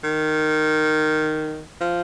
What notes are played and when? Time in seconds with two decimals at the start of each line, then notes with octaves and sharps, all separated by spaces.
0.04 D#3
1.81 F3